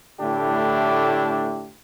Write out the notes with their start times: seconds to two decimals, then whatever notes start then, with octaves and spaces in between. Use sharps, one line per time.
0.20 A2 D3 A3 D4 E4 G4